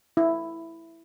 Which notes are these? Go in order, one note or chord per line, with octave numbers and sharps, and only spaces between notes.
E4